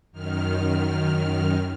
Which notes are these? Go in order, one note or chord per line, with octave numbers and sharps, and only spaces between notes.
F#2 D#3 F6